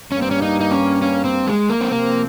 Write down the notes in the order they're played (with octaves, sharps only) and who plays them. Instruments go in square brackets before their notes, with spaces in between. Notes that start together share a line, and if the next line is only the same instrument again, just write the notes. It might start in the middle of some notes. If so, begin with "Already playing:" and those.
[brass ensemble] G2 G3 A#3 [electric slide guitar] C#4
[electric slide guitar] C4
C#4
D#4
D#4
C#4
C#4
C4
G#3
A#3
C4
[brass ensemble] C3 F3 C4 [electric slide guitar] A#3